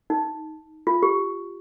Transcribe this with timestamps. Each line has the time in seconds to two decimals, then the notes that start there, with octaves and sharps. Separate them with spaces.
0.10 D#4
0.87 F4
1.03 G4